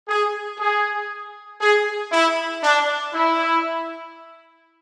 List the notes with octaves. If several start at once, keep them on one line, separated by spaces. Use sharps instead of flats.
G#4
G#4
G#4
E4
D4
E4